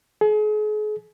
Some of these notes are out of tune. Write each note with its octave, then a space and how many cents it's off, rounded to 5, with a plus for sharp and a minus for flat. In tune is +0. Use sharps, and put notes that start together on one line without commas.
G#4 +40